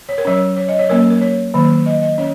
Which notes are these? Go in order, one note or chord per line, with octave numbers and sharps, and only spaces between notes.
C#5
A#4
F#3 C#4 C#5
C#5
D#5
C#5
F#3 A#3 C#4 A#4
A#4
C#5
D#3 F#3 A#3
D#5
D#5
C#4 C#5